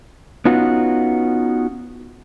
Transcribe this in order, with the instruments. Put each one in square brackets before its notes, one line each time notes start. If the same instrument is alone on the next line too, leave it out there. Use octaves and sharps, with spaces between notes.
[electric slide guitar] B3 C#4 D#4 F4 F#4